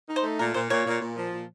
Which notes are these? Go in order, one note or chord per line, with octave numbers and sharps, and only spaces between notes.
D#4
C5
A3
A#2 A#4
A#2 C5
A#2 C#5
A#2
A#2
F3
A#2